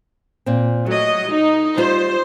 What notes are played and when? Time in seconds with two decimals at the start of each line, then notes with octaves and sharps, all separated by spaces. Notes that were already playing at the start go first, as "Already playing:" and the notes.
0.46 A#2 C4
0.86 F#3 A3 D#5
1.29 D#4
1.77 G3 F4 C5